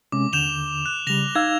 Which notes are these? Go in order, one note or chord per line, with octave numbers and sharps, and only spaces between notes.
C3 G#3 C#4 D6
D#2 D3 G6 E7 F7 G7
F#6
C#3 G3 A#6 F7 G7
D#4 F5 E6 G#6